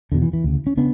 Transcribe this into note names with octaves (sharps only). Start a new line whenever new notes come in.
E2 B2 D3
E3
E3
D2 C#3
C#4
C#3 B3 D4